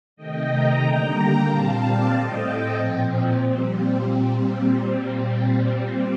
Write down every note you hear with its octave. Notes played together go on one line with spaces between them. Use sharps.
C3 D#3 A3 D#5 G5
G5 A#5
D3 G3 A#3 G5 A#5
A#2 G3 C4 F5 A5
D5 F5
A2 A3 C4 D#5 G5
A#2 F3 C4
A#2 G3 C4